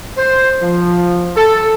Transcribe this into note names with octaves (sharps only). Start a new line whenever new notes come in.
C5
F3
A4